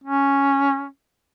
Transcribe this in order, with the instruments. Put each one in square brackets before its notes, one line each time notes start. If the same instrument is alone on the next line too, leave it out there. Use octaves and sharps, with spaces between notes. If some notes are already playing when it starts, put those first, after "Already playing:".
[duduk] C#4